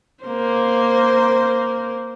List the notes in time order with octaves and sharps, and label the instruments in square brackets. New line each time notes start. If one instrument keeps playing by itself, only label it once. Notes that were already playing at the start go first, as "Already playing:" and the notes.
[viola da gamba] A#3 C5